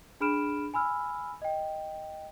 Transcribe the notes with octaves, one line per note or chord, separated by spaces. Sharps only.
D4 G#4 B5 F6 D7 E7
G#5 B5 E6 F6
D#5 G5